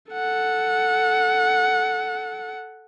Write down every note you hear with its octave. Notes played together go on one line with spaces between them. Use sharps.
A4 F#5